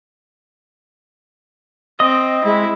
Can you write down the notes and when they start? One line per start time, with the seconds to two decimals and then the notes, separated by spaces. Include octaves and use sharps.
2.00 C4 D#5 D#6
2.44 G#3 E4